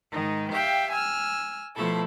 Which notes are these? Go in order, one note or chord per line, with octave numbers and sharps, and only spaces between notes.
G#2 D#3 D#4
G4 E5 F5 G5
G#5 E6 F6
B2 F3 A3 E4 A4